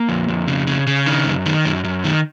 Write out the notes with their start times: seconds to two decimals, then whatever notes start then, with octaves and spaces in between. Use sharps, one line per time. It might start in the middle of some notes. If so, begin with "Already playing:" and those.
Already playing: A#3
0.09 F2
0.29 F2
0.48 C#3
0.67 C#3
0.87 C#3
1.06 D#3
1.26 F#2
1.46 D#3
1.65 F#2
1.84 F#2
2.04 D#3